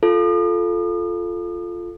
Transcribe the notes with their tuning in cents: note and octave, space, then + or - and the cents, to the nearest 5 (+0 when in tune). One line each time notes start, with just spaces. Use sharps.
F4 +0 A4 -10